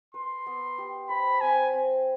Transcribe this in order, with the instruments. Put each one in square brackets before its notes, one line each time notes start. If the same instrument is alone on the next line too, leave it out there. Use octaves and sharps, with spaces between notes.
[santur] B4 [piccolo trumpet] C6
[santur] B3
G4
[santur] C5 [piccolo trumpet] B5
[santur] C4 [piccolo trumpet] G#5
[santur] C4